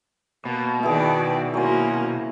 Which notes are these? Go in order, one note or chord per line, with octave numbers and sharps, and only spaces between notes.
B2 A#3
D#3 E4 G#4 B4 D5 G5
F#3 A#3 C#4 E4 A#4 C5 G#5